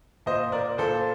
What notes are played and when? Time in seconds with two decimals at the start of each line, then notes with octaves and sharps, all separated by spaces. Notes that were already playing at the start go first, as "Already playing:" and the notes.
0.26 A#2 C5 D#5
0.52 A#4 D5
0.78 A#2 A4 C5